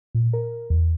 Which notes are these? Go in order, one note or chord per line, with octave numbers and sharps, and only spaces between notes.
A#2
A#4
E2